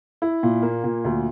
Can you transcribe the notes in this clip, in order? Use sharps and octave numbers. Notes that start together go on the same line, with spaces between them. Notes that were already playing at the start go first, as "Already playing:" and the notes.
E4
A#2
A#3
A#2
D2